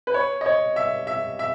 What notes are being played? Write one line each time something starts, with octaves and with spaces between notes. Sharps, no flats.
B4
C#5
D#5
C#5
E5
E5
E5